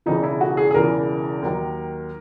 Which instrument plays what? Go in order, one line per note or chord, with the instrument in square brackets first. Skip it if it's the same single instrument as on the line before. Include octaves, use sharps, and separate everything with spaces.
[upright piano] E1 E2 C#3 E3 D#4
E4
F#4
G#4
G#4
E1 E2 C#3 E3 A#4
D#2 D#3 F#3